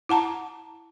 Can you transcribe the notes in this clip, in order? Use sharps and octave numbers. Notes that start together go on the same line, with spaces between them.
E4 F#5 A5 A#5